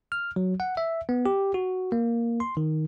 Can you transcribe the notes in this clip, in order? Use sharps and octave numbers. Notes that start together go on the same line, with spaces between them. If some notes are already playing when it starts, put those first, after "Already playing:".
F6
F#3
F#5
E5
B3
G4
F#4
A#3
C6
D#3